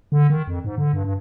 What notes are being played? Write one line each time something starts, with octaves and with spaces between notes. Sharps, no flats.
D3
D#3
F2
G#2
D3
G2
G2